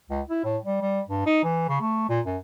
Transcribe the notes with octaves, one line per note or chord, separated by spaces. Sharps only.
C#2
E4
A2
G3
G3
G2
D#4
E3
C#3
A3
A#2
F#2